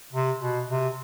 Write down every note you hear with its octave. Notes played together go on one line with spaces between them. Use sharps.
C3
B2
C3